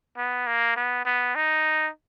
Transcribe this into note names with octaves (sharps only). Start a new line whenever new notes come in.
B3
A#3
B3
B3
D#4